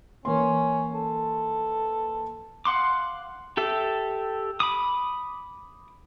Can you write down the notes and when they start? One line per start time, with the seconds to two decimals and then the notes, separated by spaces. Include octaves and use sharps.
0.25 E3 A#3 C#4 C6
0.94 A4
2.65 F5 F#5 C6 D6
3.57 G4 A4 E5
4.60 B5 D6 D#6